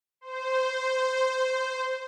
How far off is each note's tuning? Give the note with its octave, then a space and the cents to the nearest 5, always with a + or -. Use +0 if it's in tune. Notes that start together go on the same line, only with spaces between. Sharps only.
C5 -10